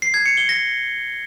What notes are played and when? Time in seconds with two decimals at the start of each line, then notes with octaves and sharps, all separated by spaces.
0.02 C7
0.14 G#6
0.26 C#7
0.37 G7
0.49 A#6